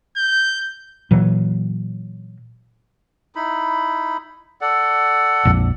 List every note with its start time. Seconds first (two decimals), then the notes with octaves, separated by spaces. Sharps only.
0.17 G6
1.11 A#2 E3 F#3
3.35 D#4 E4 B5
4.61 A4 D5 F#5
5.45 A#1 F2